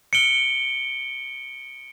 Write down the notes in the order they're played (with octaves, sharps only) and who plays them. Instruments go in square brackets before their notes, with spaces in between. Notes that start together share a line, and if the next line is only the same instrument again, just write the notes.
[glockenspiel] C#7 D7 G7